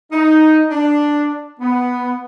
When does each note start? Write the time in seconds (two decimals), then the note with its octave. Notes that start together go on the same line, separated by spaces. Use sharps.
0.12 D#4
0.70 D4
1.60 B3